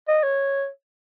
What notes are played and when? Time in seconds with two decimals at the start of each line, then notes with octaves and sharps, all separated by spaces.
0.08 D#5
0.23 C#5